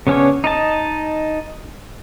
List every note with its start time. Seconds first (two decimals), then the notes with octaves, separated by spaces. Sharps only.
0.07 C#3 B3 C#4 D4 C#5
0.44 D#4 D#5 A5